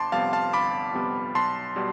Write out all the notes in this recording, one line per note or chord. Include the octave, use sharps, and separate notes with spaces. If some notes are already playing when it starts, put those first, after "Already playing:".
Already playing: G1 A5 C6 D6
F2 C3 G3 B3 F5 A5
F5 A5
G1 B5 D6
F2 C3 G3 B3
B1 A5 C6
B2 G3